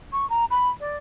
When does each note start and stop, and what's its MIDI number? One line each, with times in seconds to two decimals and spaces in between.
0.12 0.28 85
0.29 0.45 82
0.50 0.69 83
0.80 0.96 74